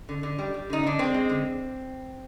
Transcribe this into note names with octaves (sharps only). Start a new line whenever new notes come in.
D3
D3
G3
G3
D3 D#4
D3 D4
G#3 C4
G#3
D3